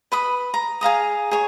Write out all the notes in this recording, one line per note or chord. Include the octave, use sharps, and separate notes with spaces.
B4 B5 D#6
A#5
G#4 F5 A#5 D#6
G#4 C#5